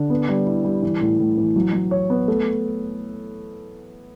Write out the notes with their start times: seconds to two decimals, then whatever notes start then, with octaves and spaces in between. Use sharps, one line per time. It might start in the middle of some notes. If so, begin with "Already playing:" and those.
Already playing: D3
0.10 B3
0.29 G3
0.47 E4
0.65 G3
0.82 E3
1.01 A2
1.19 A2
1.37 E3
1.56 F#3
1.73 F#3
1.91 C#5
2.10 B3
2.28 A3